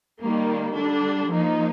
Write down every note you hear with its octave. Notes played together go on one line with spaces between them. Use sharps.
D#3 G3 A#3
D3 G3 D4
F3 A#3 D#4